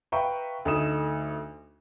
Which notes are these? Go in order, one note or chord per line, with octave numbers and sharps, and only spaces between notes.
B4 E5 F5 G5 A#5 C#6
D2 A3 D#4 D#6 E7